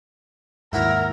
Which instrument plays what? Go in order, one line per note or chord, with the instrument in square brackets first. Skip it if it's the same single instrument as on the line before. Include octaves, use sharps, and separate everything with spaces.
[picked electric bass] D#2 G#2 [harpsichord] E4 F#4 C#5 [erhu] A#4